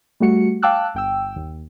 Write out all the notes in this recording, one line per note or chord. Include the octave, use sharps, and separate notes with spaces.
G3 A3 F#4 C#7
F5 G5 A5 D6 E6 F#6
G1 G5 E6
D#2